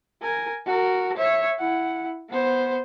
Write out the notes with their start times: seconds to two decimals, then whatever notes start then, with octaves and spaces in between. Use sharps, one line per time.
0.22 A#4 G#5
0.66 F#4 A#4
1.17 C#5 E5
1.59 E4 F#5
2.29 B3 C5